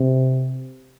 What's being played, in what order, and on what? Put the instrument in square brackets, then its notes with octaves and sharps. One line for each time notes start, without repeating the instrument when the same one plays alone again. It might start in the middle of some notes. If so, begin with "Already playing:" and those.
Already playing: [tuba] C3